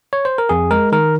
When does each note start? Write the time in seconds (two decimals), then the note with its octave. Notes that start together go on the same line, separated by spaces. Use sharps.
0.13 C#5
0.25 C5
0.38 A#4
0.49 F2 G#4
0.71 G#3 A#4
0.92 D#3 A#4